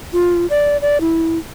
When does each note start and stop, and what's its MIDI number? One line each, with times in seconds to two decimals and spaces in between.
0.13 0.46 65
0.50 0.77 74
0.82 1.00 74
1.01 1.38 64